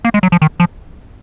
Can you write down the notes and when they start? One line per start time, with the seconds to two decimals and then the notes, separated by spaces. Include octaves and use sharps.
0.05 A#3
0.14 G#3
0.23 F#3
0.32 F3
0.42 D#3
0.60 F3